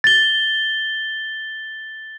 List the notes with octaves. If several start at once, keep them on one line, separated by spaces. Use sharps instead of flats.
A6 G7